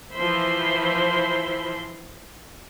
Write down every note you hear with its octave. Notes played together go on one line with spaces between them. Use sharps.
E3 F3 C5 E5 B5 C6